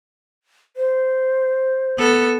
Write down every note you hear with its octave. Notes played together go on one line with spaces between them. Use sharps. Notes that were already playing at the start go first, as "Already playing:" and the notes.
C5
B3 A4